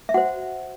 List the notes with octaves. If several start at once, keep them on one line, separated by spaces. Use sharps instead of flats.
E5
F#4 C5 F#5